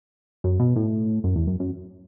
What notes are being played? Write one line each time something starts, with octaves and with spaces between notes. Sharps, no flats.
F#2
B2
A2
F#2
E2
F#2
F#2